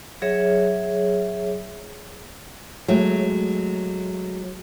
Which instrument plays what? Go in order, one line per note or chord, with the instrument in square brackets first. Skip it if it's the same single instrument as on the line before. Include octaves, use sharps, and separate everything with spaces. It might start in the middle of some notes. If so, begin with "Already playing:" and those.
[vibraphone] F#3 G#4 C#5 E5
[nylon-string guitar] F#3 G#3 A3